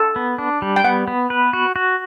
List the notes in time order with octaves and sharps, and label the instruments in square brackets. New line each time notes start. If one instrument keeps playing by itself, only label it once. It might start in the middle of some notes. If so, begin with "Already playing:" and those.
Already playing: [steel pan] A4
[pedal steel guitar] B3
D4
G3
[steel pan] G5
[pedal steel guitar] B3 [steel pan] F#5
[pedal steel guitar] B3
B4
F#4
F#4